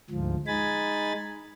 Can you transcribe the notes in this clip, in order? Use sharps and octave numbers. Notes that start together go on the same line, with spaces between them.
D2 G#2 F3
G#3 D#4 G#5 B5 A6